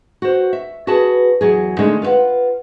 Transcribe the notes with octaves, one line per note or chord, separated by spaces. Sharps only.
F#4 C5
E5
F#4 G#4 B4 A5
E2 F#3 G#4
D3 G#3 A3 C#4 D#4
F4 B4 C5 F5 F#5